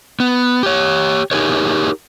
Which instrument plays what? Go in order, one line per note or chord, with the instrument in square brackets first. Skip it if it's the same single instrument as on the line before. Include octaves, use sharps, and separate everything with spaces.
[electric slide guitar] B3
G4 C#5
D#4 G4 G#4 A#4 C#5